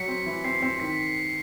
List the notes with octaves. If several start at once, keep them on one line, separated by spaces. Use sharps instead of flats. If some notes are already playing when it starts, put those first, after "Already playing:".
Already playing: F#3 B6 C#7
C4
E3
C4 C7
C4
D#3 B6